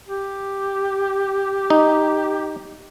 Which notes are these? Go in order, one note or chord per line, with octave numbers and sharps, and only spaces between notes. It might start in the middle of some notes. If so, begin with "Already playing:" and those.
G4
D#4